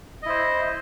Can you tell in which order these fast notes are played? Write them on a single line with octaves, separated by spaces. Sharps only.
D#5 E4 C5